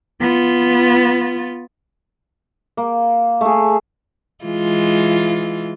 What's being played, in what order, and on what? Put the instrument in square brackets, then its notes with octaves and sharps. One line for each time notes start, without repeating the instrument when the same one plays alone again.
[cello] B3 F4
[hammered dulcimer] A#3
A3 G#4
[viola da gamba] E3 G#3 F4